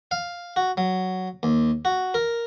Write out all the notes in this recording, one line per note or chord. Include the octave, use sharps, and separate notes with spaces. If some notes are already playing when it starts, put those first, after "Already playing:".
F5
F#4
F#3
D#2
F#4
A#4